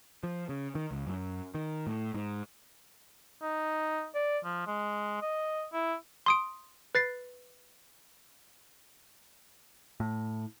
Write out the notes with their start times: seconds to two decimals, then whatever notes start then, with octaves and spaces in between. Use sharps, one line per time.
0.23 F3
0.49 C#3
0.75 D#3
0.91 C#2
1.07 F#2
1.55 D#3
1.87 A2
2.14 G#2
3.42 D#4
4.15 D5
4.44 F3
4.67 G#3
5.22 D#5
5.73 E4
6.26 C6 D#6 D7
6.95 B4 A6 C7
10.00 A2